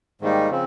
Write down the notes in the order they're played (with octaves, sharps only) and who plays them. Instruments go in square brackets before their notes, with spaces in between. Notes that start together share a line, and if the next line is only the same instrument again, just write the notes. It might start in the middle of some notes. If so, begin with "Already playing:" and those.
[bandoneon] G#2 D#3 G3 A#3 D#4
C#3 F3 C4